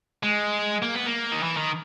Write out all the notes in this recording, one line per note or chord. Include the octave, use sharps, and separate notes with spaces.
G#3
A#3
B3
A#3
D#3
E3
D#3